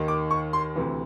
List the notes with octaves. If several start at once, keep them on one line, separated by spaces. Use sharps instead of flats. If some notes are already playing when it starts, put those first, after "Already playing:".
Already playing: D#2 D#3
D6
C#6
C6
D2 C3 E3